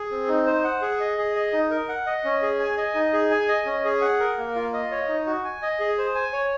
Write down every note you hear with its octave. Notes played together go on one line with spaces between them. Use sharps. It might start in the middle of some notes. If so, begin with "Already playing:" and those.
Already playing: G#4
C4
D#4
C5
F#5
G#4
D#5
G#4
D#5
D#4
A#4
F#5
D#5
C#4
G#4
G#5
D#5
D#4
G#4
G#5
D#5
C#4
G#4
F#5
A#4
A#3
F4
D#5
C#5
D#4
F#4
G#5
D#5
G#4
C5
G#5
C#5